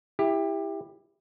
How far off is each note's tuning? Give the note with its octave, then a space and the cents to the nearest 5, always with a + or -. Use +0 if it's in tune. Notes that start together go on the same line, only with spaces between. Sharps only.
E4 +0 G4 +20